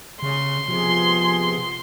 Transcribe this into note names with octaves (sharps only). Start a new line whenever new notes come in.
C#3 C6
C3 F3 B3 G#4